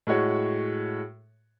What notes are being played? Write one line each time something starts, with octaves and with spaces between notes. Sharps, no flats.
A2 G#3 F#4 C#5